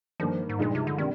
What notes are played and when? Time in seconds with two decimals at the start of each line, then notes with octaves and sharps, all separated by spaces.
0.20 G2 D#3 F3 A#3
0.49 G#2
0.59 G2 A#2 F3 G#3 D#4
0.75 C3
0.87 D3
0.98 C3 D#3 G3 D4